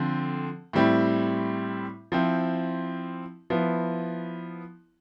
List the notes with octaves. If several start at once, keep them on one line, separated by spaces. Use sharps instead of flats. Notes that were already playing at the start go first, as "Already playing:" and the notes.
Already playing: D3 F3 C4
A2 G3 C4 E4
F3 C4 E4
F3 B3 E4